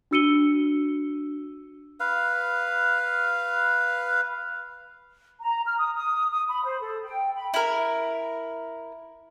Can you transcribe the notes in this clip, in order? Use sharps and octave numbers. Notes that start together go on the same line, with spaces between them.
D4 F#4 E6 C#7 D#7 G7
B4 F5
A#5
F6
D#6
D#6
D#6
B5
C5
A4
G5
B5
E4 A#4